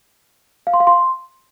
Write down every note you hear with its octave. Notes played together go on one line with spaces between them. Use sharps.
F5
C6
F5
C6